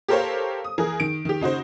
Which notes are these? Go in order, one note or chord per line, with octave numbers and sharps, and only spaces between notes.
G4 A4 A#4 C5 C#5 F5
D#6
E3 G#4 A#4
D#3 D7
D#3 G4
C#3 D#4 F#4 C5